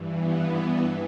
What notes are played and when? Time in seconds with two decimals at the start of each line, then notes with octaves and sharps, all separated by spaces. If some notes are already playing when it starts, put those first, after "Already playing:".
Already playing: G2 E3
0.17 B3
0.77 E3